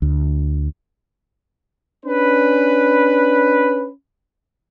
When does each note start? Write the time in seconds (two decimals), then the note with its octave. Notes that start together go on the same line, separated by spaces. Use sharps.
0.02 D2
2.06 C#4 D4 B4